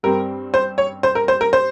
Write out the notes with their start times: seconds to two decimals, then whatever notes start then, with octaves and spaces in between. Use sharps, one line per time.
0.03 G2 G3 C4 A#4
0.54 C5
0.78 C#5
1.03 C5
1.15 A#4
1.28 C5
1.41 A#4
1.53 C5